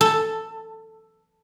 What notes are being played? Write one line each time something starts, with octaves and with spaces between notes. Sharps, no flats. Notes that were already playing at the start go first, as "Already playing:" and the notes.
A4